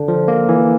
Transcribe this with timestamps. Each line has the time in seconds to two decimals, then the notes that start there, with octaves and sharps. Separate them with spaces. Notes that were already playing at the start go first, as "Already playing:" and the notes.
Already playing: D3
0.08 F3
0.28 A#3
0.49 E3